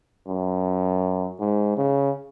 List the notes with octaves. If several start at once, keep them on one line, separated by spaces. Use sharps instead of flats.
F#2
G#2
C#3